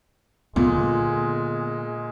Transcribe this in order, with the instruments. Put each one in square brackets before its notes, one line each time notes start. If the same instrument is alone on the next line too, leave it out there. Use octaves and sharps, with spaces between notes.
[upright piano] A#2 [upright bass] D3 B3 [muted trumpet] G#3